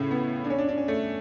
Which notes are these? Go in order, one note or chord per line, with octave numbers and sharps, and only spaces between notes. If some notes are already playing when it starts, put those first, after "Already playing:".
Already playing: A2 C#3
B3
D4
C#4
D4
D4
C#4
A3